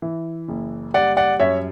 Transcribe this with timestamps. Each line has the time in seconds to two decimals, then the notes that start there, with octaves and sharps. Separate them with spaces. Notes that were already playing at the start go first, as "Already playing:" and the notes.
0.02 E3
0.48 F#1
0.94 G3 D5 F#5
1.17 D5 F#5
1.40 F#2 C#5 E5